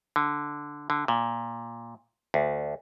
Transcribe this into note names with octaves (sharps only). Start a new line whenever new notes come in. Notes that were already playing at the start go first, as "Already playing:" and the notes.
D3
D3
A#2
D2